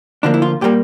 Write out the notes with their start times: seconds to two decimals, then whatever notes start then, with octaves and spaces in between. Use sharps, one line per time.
0.23 D2 D3 F3 A#3 D4
0.34 E4
0.42 F4
0.61 A#2 G3 A#3 G4